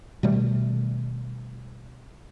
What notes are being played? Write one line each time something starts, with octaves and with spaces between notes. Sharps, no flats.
B2 D#3 G3 A3